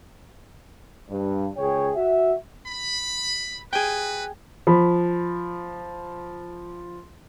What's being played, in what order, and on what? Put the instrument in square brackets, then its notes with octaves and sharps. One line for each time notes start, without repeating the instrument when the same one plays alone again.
[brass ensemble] G2
C#2 G#4 C#5 G5
F#4 E5
[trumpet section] B5
[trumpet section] F#4 B4 [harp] G#4 G5
[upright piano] F3 B5